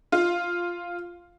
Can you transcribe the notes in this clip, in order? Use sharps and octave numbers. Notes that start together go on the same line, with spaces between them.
F4